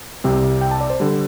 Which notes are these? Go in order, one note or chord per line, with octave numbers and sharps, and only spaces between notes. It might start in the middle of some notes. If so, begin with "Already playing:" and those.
C2 C3 G3 C4
G5
A5
D5
C5
D3 G3